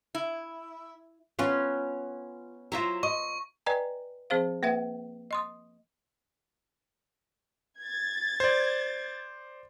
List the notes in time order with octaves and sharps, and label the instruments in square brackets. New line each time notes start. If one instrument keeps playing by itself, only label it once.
[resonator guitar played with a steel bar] E4
[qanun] B3 C#4 [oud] F4
[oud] F#3 E4 F4 [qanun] C5 E5 A#5
[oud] D#5 [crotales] C#6
[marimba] B4 D5 D#5 G5 G#5 A#5
F3 C4 G#4 C5 F5
A#3 B4 E5 F#5 G5
D#5 C6 D#6
[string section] G#6 A6
[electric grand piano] C5 D5